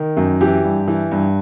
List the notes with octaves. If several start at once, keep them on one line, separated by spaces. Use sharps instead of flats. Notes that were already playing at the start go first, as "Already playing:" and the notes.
Already playing: D#3
F#2
E3 G4
G2
E3
G2